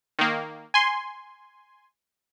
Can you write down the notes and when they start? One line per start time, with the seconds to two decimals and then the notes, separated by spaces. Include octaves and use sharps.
0.19 D#3 A#3
0.74 G#5 C6